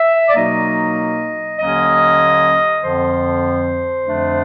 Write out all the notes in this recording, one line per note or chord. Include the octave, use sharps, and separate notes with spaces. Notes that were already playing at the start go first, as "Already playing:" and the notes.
Already playing: E5
D5
B2 F#3 A#3 D#4 D#5
D#2 D3 F#3 A#3 C#4 D#5
F2 D3 F3 C5
F2 D3 F3 A3 D4